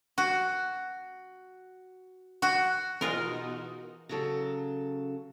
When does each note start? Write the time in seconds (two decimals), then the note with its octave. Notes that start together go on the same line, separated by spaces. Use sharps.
0.18 F#4
2.42 F#4
3.01 B2 E3 G#3 D#4 F4 F#4 A#4 D#6
4.09 C#3 F#3 A4